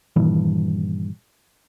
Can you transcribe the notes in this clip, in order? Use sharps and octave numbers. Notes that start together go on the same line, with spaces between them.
G2 A#2 D#3 E3